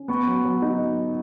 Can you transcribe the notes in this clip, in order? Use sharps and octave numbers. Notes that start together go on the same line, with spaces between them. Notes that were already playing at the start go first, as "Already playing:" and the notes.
Already playing: C#4
B3 C#6
F#3
F#3
D#4